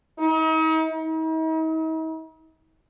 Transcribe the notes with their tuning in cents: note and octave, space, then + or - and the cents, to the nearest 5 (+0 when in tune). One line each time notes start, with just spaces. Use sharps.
D#4 +40
D#4 +45